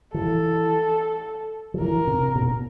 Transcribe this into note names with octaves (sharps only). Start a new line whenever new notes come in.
E3 A4
F3
E3 A#4
C3
B2